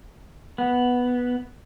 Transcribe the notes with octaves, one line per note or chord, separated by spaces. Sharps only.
B3